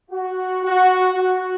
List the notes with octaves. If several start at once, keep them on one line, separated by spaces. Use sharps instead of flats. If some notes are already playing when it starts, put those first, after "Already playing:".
F#4
F#4
F#4